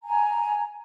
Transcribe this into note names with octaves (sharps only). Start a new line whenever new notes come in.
G#5 A#5